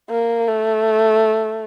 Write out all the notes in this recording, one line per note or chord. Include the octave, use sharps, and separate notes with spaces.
A#3
A3